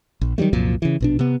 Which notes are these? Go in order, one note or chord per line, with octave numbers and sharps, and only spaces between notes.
A#1
D#3 F#3 G3 A3
C2 F#2 A#2 F3
C#3 E3
A#1 B2 D4
C3 B3